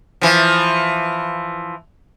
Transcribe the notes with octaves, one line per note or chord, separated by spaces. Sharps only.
E3 F3